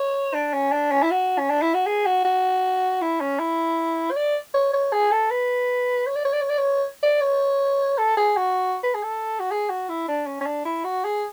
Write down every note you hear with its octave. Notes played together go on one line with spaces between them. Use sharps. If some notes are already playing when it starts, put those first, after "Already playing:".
Already playing: C#5
D4
C#4
D4
C#4
E4
F#4
C#4
D4
E4
F#4
G#4
F#4
F#4
E4
C#4
E4
C#5
D5
C#5
C#5
G#4
A4
B4
C#5
D5
C#5
D5
C#5
D5
C#5
D5
C#5
A4
G#4
F#4
B4
G#4
A4
F#4
G#4
F#4
E4
D4
C#4
C#4
D4
E4
F#4
G#4